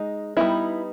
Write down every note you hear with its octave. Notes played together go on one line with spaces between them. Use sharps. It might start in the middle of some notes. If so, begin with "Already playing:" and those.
Already playing: G#3 D#4
G3 B3 D#4 E4